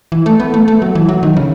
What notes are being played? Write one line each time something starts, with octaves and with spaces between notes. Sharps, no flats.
E3
A3
B3
A3
A3
F#3
E3
F#3
D#3
C#3